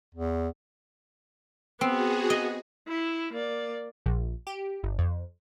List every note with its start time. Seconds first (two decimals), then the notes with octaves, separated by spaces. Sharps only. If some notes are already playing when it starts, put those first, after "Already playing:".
0.15 E2
1.81 B3 C4 F#4 G#4
2.30 D#5
2.88 E4
3.33 A#3 D5
4.06 A#1
4.47 G4
4.83 G1
4.99 F2